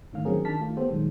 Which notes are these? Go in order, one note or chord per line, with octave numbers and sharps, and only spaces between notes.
G#2 D3 D#3 A3 F5 F6
D#3 F#3 C4 C#4 G#4 A#4
D#3 D4 D5 A5 F6 B6
D#3 A3 F4
A#3 B3 G4 A4 C5
A#1 A#2 D#3 F#3 G#3